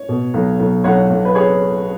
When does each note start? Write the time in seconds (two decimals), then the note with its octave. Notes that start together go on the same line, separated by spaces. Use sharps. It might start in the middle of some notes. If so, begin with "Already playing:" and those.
Already playing: C#5
0.09 B2
0.34 B1
0.59 B1
0.84 B1 C#5 F#5
1.10 B1
1.25 B4
1.35 G#4 C#5